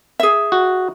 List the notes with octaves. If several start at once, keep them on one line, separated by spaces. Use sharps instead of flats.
G#4 E5
F#4